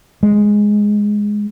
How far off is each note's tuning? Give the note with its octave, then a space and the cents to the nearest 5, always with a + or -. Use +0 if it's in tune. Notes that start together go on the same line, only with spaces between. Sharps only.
G#3 +0